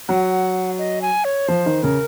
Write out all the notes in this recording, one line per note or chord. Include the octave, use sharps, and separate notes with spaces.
F#3 F#5
D#5
G#5
C#5
F3 C5
D#3
C#3 A#4